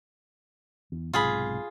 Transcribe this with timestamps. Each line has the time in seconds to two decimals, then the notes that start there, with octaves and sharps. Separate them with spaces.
0.92 E2
1.13 B1 G#2 C3 F4 G#4 B5